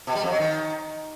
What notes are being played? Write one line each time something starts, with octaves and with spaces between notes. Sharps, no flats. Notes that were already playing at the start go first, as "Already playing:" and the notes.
B2
G3
F2
F#3
D#3